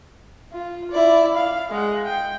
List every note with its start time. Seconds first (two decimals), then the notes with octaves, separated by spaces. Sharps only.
0.53 F4
0.91 E4 D5
1.35 F5
1.71 G#3 F#5
2.05 G5